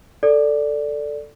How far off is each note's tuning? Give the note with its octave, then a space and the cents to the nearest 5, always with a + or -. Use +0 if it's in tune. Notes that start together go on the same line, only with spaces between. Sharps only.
A4 +5 D5 +0